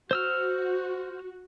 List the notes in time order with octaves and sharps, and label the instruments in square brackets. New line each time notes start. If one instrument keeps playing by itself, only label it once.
[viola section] F#4 [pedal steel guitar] C5 E6 F6